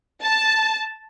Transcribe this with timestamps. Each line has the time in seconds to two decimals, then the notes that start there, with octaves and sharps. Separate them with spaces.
0.23 A5